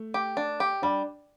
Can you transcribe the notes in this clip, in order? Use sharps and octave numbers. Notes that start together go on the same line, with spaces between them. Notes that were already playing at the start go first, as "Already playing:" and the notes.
Already playing: A3
G4
D4
G4
G3 D4